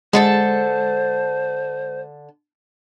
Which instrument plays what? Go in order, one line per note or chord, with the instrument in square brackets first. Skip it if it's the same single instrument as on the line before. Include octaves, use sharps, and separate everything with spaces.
[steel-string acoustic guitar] D3 A4 A5 [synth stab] G#3 [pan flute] C5